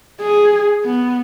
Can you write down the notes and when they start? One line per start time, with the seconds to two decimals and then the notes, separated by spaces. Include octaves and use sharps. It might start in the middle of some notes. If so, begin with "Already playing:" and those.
0.20 G#4
0.84 B3